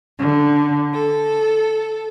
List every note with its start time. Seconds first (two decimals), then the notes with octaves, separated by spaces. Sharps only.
0.18 D3
0.94 A4